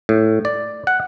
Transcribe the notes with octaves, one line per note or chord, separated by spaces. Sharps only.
A2
D5
F#5